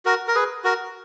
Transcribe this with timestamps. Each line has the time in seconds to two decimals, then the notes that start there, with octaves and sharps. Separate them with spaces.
0.05 F#4 A#4
0.28 A#4
0.35 G#4 B4
0.64 F#4 A#4